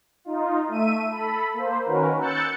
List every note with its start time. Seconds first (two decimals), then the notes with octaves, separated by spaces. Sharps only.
0.25 D#4 F4
0.68 A3 E5 D#7
1.10 A4 B5
1.53 A#3 C5
1.85 D#3 C#4 F#4 A#4 B4
2.20 E6 F#6 G6 A6 C#7